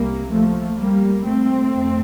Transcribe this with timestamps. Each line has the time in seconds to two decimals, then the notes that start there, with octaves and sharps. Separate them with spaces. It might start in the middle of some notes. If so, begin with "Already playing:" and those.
Already playing: C2 C3 G3 A#3
0.32 F3 A3
0.79 G3 A#3
1.26 A3 C4
1.72 F2